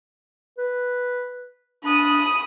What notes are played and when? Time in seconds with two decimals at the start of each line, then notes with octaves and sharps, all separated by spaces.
0.58 B4
1.84 D4 B5 D#6